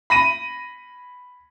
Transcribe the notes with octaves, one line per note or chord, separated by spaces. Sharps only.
B5 A#6 D#7